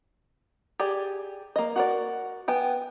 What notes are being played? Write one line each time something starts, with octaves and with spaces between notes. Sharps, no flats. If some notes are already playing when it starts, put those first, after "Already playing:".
G4 G#4 D5
A#3 D#5
F#4 A#4 D5
B3 G5 G#5